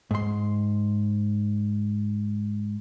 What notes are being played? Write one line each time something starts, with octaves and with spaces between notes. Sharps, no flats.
G#2 C6